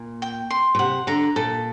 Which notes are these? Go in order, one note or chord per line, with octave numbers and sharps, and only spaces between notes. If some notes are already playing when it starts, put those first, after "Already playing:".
Already playing: A#2
G5
C6
A#2
C3 F#5
D3 A#5
A#2 A4